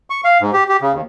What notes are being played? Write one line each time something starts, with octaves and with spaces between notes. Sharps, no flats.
C#6
F5
G#2
G4
G4
C#3
D#2